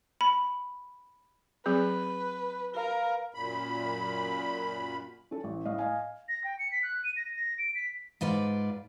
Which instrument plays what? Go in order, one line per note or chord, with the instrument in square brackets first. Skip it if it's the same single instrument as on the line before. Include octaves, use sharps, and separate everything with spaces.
[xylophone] B5
[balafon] F#3 C4 G#4 [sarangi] B4
[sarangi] A#4 [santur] B4 F5 A#5
[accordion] F#2 A#2 B5
[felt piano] C#4 A4
A1
A2 D#5 F5
D#5 F5 G#5
[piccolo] A#6
G5
C#7
B6
F#6
D#7
A#6
A#6
D7
B6
[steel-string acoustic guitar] G#2 F4 B4 D5